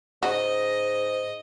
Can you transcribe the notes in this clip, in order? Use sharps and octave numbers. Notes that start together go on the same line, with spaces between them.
G#2 C#3 F#4 D#5